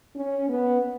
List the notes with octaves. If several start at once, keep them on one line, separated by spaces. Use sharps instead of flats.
C#4
B3